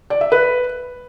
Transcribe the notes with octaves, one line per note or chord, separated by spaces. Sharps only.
D5
E5
B4